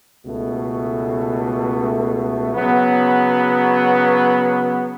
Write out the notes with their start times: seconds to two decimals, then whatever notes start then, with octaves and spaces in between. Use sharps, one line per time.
0.24 C#2 B2 A3
2.54 C#3 F#3 B3